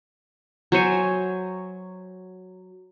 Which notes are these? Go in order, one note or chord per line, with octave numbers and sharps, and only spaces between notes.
F#3 C5 C#5 G#5